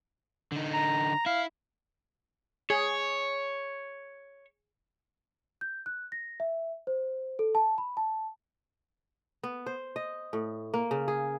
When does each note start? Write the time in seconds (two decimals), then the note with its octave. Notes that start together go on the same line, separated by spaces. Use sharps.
0.52 D3 D#4
0.73 A#5
1.26 E4 F5
2.70 G#4 C#5
5.61 G6
5.86 F#6
6.12 A#6
6.40 E5
6.87 C5
7.39 A4
7.55 A5
7.78 B5
7.97 A5
9.43 B3
9.66 C5
9.96 D#5
10.33 A2
10.74 A#3
10.91 C#3
11.08 G#4